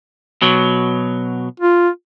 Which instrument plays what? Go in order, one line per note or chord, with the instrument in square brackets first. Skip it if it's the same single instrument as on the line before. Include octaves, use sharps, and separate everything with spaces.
[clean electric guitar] B2 F#3
[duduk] F4